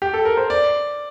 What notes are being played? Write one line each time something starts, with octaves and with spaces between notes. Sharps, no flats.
G4
A4
A#4
C5
D5